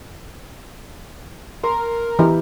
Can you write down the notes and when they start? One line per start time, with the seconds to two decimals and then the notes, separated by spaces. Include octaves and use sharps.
1.63 A#4 C6
2.19 E3 E4 G4